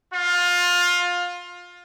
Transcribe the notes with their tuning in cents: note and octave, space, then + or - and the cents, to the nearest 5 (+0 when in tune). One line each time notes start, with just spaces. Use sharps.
F4 +20